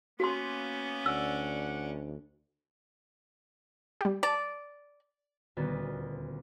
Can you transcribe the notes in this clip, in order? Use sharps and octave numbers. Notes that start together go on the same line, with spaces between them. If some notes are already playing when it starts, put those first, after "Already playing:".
A#3 B3 C#4 F#4 C6
D2 D5 F#5 E6
G3 G4
D5 A5
D#1 D2 A#2 B3 F#4 A6